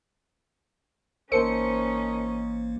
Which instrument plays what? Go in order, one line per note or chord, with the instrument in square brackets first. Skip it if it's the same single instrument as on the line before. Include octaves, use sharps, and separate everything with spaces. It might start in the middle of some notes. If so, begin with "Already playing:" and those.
[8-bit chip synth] A1 A#3 [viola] C#4 D#4 [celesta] A#4 A5 [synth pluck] C5 C#7